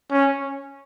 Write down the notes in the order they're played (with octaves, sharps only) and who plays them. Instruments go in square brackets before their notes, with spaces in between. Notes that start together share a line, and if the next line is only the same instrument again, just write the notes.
[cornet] C#4